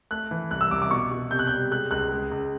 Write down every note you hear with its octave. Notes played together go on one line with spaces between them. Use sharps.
A3 F#6
E3
C2 F#6
E6
C2 D6
D6
B2 C#6
B2
C3 G6
F#6
G3 G6
G#3 F#6
C#2 F#6
G#3
C#2